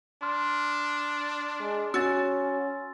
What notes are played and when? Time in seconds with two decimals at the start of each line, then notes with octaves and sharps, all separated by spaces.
0.22 D4 C6 F6
1.60 G#3
1.94 C#4 F#4 E6 A6